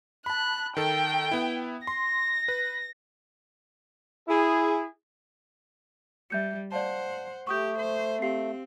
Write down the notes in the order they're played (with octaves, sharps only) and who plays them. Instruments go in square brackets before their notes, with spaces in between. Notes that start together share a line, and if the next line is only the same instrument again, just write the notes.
[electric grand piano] A5 B5 [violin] F#6
[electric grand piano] D#3 A4 [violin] G5
[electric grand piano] B3 E4
[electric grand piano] C6 [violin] A#6
[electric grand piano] B4
[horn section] E4 G#4
[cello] G3 [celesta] E5 G6 C#7
[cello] C5 F#5 [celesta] D5 F5 A5
[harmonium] A3 [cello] G4 [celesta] C#6 D#6 G6
[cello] C5
[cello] C4 [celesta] G4 F5 C7